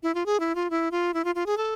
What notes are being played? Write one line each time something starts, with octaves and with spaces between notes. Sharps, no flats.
E4
F4
G#4
E4
F4
E4
F4
E4
F4
F4
G#4
A4